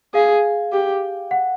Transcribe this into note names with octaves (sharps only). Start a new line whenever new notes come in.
G#4 F5
G4
F#5